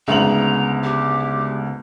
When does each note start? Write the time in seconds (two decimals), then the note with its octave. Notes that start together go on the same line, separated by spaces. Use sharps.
0.08 D2 G#2 C#3 B3 A#5 F#7
0.83 G4